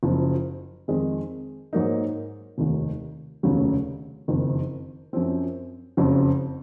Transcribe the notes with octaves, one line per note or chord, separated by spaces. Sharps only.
F#1 F#2 F3
F2 D#3 G#3 C4
G#2 F#3 A#3 D#4
F1 D#2 D#3
F1 D#2 C#3 F#3
F#1 F2 D#3
F#2 F3 C4
F#1 F2 C#3 F#3